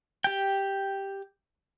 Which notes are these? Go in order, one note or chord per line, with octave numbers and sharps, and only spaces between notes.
G4 G5